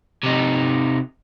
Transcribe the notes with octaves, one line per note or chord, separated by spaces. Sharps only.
C3 D#4